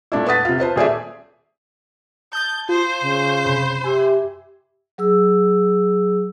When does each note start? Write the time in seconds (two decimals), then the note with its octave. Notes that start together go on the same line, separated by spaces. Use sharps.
0.12 A#2 A3 D4 E4
0.26 B4 F#5 D#6 A6 B6
0.45 C3 F4
0.59 F4 B4 C5 A5
0.76 D#1 G#4 D5 E5
2.33 A5 D#6 G6 A6
2.69 F4 C5
3.01 C#3
3.45 F#2 C3 B5
3.84 G4 E5 G#5
4.98 F#3 G#4 E6